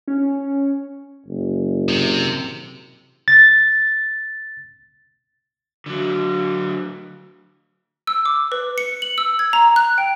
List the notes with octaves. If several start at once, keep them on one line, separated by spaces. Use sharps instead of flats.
C#4
F#1
C3
A6
D3 F#3
E6
D6
B4
C#7
F#7
E6
G#6
A#5
F#6
G5